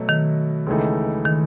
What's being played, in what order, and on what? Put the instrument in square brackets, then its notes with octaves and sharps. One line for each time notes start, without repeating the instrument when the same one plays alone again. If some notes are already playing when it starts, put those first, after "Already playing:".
Already playing: [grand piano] B2 F#3 A3
[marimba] D#3
[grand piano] C#2 C#3 E3 A3 D#4
[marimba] D#3